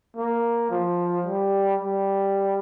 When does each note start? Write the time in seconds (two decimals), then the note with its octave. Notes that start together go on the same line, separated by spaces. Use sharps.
0.17 A#3
0.70 F3
1.25 G3
1.80 G3